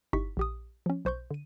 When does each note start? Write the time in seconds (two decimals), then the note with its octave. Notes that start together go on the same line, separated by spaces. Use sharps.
0.13 G1 D#4 E4 G4 C#6 B6
0.37 A#1 G4 D#6
0.86 F3 C#4
1.05 B1 C5 C#6 G6
1.31 D3 D#7